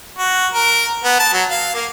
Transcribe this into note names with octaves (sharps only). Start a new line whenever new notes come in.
F#4
A#4
B3
A5
F#3
F5
A#3